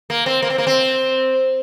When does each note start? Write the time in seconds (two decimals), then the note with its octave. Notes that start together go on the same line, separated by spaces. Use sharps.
0.10 A#3
0.26 C4
0.43 A#3
0.50 C4
0.58 A#3
0.67 C4